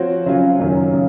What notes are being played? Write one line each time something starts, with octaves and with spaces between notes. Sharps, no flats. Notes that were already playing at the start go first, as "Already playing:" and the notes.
Already playing: F3 C4 F#4 C#5
C#3 F#3 C#4 F4
F#2 D#3 F#3 C#4
C#3